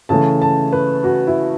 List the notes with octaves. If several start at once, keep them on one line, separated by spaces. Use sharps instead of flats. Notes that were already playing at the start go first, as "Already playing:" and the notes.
C#3 E3 A3 A5
A5
B4
F#4
E4